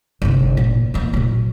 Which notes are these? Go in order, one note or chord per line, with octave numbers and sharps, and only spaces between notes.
G1 C3
A#2 F#3
E3 A#3
A#2 F#3